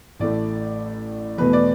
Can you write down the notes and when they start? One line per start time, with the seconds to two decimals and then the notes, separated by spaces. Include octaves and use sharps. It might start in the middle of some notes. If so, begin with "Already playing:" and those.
0.19 A1 A2 A3 D5
1.38 E2 B2 A3 B4
1.53 D5